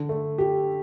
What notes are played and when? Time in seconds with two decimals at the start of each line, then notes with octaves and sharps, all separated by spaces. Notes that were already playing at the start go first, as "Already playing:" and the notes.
Already playing: D3
0.09 A3
0.38 G4